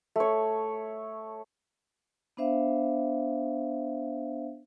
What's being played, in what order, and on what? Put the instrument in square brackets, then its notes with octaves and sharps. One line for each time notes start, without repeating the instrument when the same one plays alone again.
[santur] A3 C#5
[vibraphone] B3 D4 C5 E5 F5